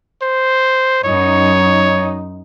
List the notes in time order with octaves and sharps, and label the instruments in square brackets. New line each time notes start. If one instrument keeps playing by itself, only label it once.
[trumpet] C5
[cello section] F#2 D#4 [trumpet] C#5